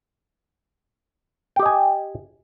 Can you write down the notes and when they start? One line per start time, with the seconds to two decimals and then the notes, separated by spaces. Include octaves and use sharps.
1.56 G5
1.59 G4
1.63 D#5
1.66 G#5